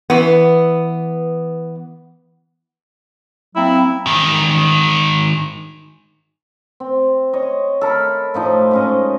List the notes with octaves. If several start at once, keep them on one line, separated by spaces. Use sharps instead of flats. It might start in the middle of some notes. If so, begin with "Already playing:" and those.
E3 B3
F#3 A#3 C4 E4
G#2 D#3
C4
C#5 D#5
A4 A#4 E5 B5
A2 F3 D#4
G#2 C#4 D#5